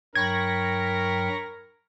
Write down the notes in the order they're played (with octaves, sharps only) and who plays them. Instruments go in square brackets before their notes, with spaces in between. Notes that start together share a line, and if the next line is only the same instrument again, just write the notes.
[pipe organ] G2 F#3 G5 [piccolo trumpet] A#4 [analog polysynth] B5 C#6 A#6 [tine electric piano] G#6